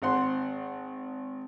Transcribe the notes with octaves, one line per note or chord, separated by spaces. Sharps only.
G#1 C5 F#5 C6